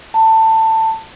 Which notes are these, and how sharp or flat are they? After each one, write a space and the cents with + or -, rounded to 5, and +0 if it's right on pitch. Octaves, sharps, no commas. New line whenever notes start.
A5 +20